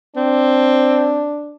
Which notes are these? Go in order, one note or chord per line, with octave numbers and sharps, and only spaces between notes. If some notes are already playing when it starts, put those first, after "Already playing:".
C4 D4